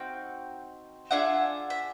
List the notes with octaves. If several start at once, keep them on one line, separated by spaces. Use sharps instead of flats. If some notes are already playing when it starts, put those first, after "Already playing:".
Already playing: C4 D#4 F#4 F5 G5
D4 F4 G#4 E5 F#5
E5